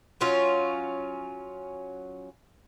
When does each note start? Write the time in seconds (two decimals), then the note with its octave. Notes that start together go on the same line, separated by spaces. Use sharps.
0.21 F#3 C#4 F4